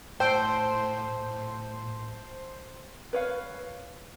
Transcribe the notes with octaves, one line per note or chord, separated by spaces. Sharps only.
A2 C5 G5 A5 E6 G6
B4 C#5 F5